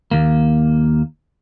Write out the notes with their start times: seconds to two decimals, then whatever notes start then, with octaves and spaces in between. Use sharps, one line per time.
0.11 D#2 A#3